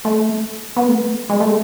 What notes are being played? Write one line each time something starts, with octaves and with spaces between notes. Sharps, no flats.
A3
B3
A3
G#3
A3